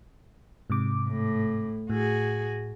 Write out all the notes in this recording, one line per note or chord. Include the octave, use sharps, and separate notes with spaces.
G#2 C3 D6
A2
A2 F#4 G#4